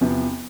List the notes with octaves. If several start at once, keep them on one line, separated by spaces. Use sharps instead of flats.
E2 C3 F3 B3